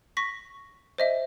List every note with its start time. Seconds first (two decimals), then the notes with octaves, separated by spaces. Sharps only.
0.17 C#6 A#6 B6
0.98 C5 D#5 E5